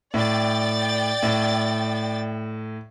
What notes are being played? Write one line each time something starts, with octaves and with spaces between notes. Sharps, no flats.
A2 D5 G5 A6
A2